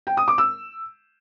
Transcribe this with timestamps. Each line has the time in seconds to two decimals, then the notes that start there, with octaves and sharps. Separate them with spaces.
0.07 G5
0.17 D#6
0.28 D6
0.38 E6